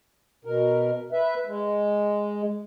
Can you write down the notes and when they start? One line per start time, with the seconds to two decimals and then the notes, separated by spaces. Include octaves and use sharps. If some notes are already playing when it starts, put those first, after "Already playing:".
0.45 B2 A#4
1.12 B4 E5
1.46 G#3